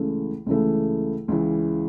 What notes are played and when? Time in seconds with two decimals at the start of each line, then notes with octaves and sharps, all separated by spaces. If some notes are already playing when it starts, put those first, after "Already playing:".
Already playing: C#2 C#3 E3 A3
0.46 C#2 C#3 E3 A3
1.28 C#2 C#3 E3